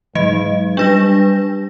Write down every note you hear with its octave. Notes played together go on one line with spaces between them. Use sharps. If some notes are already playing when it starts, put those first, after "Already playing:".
G#2 F#3 D#5
G3 D4 B4 A#6